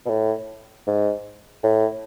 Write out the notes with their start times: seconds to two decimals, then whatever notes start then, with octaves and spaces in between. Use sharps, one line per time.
0.06 B2
0.10 A2
0.87 G#2
1.63 A2